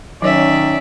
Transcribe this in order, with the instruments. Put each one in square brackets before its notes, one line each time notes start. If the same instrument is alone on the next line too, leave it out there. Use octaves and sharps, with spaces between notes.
[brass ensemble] D#3 [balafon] F#3 C#5 [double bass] C#4 [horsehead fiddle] D5 E5